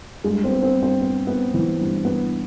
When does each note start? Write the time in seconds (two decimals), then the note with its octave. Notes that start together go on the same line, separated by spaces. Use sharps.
0.24 G2 G#3 G#4
0.44 C4 C5
0.51 B3
0.63 C4 C5
0.76 G2
0.83 C4 C5
1.02 B3
1.27 B3
1.54 E3
1.80 G2
2.05 B3